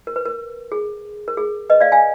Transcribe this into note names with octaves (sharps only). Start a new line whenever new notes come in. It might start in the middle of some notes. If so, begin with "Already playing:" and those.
A#4
B4
A#4
G#4
A#4
G#4
B4 D#5
D5 F5
F5 G#5